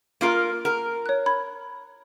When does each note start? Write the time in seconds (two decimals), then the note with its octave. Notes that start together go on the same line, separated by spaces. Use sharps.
0.21 A#3 F4 A#4
0.65 A#4 F#5
1.06 C#5 F#6
1.26 B5 G#6